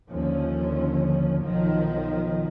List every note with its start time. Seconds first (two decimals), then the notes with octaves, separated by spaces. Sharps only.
0.11 D#2 D3 F3 C#4
1.42 B1 D#3 F3 F#3